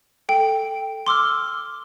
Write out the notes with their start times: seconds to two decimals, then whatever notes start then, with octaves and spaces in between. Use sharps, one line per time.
0.29 A4 G5
1.07 C6 D6 E6 F6